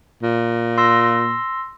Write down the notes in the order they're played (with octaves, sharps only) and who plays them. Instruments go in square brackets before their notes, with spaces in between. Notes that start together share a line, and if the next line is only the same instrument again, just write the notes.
[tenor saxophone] A#2
[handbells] C6 E6 A#6